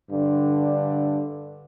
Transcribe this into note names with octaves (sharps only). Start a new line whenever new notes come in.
G2 D3 D4